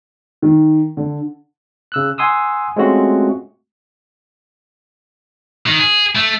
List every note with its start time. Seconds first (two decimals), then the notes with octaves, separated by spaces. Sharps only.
0.42 D#3
0.97 D3
1.92 C#3 E6 F#6
2.18 F#5 G#5 C6 D#6 E6
2.76 G#3 A3 C4 C#4 F4 F#4
5.67 D#3
5.79 G#4
6.15 A3